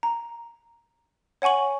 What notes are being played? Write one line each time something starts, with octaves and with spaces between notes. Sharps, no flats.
A#5
C#5 F#5 G#5 C#6 F#7